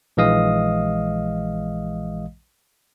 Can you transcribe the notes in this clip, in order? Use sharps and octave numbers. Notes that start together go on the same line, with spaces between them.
A#1 E3 G#3 D#5 F5 D#6